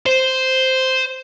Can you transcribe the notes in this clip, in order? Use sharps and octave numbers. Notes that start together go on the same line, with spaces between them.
C5